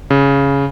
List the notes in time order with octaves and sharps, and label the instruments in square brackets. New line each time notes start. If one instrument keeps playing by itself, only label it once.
[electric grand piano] C#3